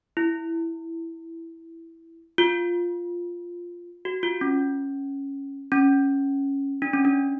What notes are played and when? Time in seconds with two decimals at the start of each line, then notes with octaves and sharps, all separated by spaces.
0.17 E4
2.38 F4
4.05 F#4
4.23 F4
4.41 C#4
5.72 C#4
6.82 D4
6.93 C#4
7.05 D4